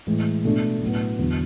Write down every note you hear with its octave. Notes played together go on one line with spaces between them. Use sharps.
A2 E3 G#3
B2 A3 D4
A2 F#3 B3
E2 D3 F#3